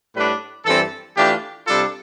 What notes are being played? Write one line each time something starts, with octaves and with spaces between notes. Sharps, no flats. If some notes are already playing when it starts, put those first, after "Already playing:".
A2 G3 D4 B4
G2 E3 G3 C4 A4
E3 A3 D4 F4 G4
C3 G3 D4 F4 A4